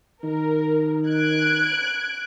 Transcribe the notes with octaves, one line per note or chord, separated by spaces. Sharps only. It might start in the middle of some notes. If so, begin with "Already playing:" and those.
D#3 A#4
F#6 G#6 D7